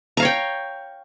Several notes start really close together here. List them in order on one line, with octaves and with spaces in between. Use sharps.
A#5 F5 C#5 G5